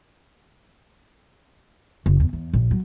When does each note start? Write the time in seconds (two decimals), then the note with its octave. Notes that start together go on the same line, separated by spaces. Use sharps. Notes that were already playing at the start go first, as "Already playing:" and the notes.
2.06 F#1
2.20 E2
2.33 E2
2.53 A#1
2.71 F#3